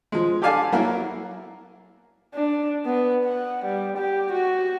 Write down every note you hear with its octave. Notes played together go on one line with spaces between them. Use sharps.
F3 G#3
G4 A4 D5 F5 G#5 A5
F#3 A#3 E4 F#4 A#4
D4
B3
F#5
G3
G4
F#4